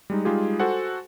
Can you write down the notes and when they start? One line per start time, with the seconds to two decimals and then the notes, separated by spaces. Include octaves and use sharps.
0.10 G3 G#3 D#4
0.25 G3 G#3 D#4 F4 G4 G#4
0.59 F#4 A4 C5 F#5 G#5